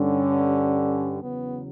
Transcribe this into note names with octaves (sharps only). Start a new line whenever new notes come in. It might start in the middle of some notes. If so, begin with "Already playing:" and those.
Already playing: G2 D3 G3 C#4
E2 C#3 F#3 B3